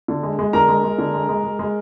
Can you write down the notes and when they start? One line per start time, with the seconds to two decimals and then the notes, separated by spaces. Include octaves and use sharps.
0.08 D3
0.23 G#3
0.39 G#3
0.53 D3 A#4 A#5
0.69 G#3
0.84 G#3
0.98 D3
1.14 G#3
1.29 G#3
1.44 G#3
1.59 G#3